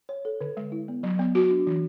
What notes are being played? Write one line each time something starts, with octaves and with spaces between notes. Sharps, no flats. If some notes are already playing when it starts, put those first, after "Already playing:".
C#5
A4
D3
G#3
E4
B3
F#3
B3
F#4
D4
E3